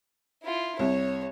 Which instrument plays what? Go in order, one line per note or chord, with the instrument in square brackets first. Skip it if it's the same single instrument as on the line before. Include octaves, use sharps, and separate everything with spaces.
[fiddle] E4 F4
[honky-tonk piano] C2 [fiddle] C#5